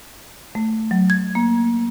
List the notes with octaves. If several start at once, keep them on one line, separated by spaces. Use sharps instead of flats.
A3
F#3
G#6
A#3